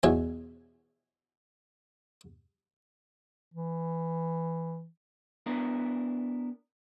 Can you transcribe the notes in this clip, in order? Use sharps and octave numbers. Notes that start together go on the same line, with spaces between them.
B1 E2 B2 C#5 E5 G#5
E3
B3 D4 E4 A#4